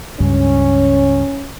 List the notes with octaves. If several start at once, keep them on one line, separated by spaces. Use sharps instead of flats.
C#2 G2 C#4